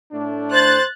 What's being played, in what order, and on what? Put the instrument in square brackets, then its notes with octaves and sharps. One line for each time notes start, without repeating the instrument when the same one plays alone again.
[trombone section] A2 A3 D4
[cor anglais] C5 [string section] F#6 A6